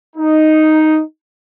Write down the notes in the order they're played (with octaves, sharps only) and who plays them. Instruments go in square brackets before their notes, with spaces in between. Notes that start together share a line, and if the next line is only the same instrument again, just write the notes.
[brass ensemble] D#4